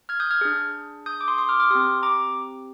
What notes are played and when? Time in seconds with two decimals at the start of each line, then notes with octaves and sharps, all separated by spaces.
0.09 F6 G#6
0.20 D#6 G6
0.31 F6 G#6
0.41 D4 G#4
1.06 D#6 G6
1.21 D6
1.28 C6 D#6
1.38 C6 D#6
1.49 D6 F6
1.60 D6 F6
1.71 C4 G4 C6 D#6
2.03 A#5 D6